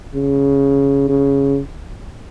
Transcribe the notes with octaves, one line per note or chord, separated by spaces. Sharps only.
C#3
C#3